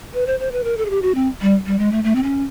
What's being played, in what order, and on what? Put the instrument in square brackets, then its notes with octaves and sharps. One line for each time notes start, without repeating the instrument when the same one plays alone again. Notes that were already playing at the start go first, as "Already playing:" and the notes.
[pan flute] B4
C5
C5
B4
A#4
A4
G#4
G4
F#4
C4
G3
G3
G#3
A3
A3
C4
C#4